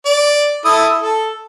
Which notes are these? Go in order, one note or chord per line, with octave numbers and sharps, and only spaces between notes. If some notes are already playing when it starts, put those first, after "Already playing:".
D5
E4 A4 D#6
A4